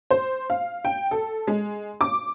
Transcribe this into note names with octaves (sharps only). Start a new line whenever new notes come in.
C5
F5
G5
A4
G#3
D6